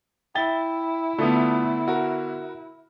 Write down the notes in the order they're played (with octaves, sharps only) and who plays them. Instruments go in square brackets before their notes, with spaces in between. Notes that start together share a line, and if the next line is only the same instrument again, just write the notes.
[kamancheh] E4 [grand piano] E5 A6 G7 [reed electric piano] G5
[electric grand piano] D3 B3 [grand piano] A3 [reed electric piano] F4 A5 D#6
[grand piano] F#4 A#4 [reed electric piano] E5